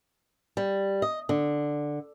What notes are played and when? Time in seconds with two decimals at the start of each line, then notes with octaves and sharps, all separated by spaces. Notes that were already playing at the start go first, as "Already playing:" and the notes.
0.57 G3
1.02 D#5
1.29 D3